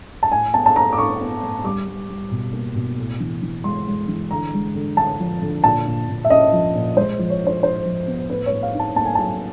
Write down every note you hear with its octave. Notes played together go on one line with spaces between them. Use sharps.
A5
A2 G#5
B3 A5
A5
A2 A#5
D6
A2 C#6
B3
A2
G3 D6
G3
G3
B2
A#3
B2
A2
E3
E3
G#3 C6
G#3
E3
D3 A#5
G#3
D3
D3 A5
F3
D3
A#2 A5
A#2
A#2
E5
C#4 D#5
F3
A#2
G#3 C5
F3
C#5
D4
C5
D4 C5
F3
B3
A2 B4
C#5
A2
F5
D#4
A5
A#3 A5
G#5
F#3 A5